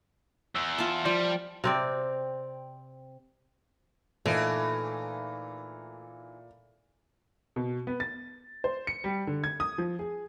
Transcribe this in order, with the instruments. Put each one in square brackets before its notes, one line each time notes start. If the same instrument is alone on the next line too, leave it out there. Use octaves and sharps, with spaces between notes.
[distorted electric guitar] E2 [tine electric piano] E6
[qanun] F4 E5 A5
[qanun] F3 [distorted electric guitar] G3 [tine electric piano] D5 C6
[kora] C3 C4 D5
[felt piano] A#2 [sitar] E3 D#4 [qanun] A3
[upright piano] B2
B3
A6
C5
C#7
G3
D3
G#6
D#6
F3
G#4